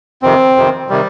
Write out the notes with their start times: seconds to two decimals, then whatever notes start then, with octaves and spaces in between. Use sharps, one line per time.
0.22 F2 C3 D#3 C4
0.56 F2 C3 D#3
0.89 C3 D#3 G3